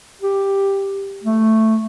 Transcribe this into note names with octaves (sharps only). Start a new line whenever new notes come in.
G4
A3